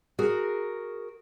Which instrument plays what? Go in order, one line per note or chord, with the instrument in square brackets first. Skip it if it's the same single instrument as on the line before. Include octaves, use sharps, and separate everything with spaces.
[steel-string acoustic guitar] F#4 G#4 A#4